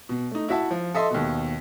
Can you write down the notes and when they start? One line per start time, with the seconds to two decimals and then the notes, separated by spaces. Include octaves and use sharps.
0.09 B2
0.31 A3 D#4
0.48 E4 F#4 E5 A5
0.71 F3
0.95 A4 D#5 E5 C6
1.10 D#2 B2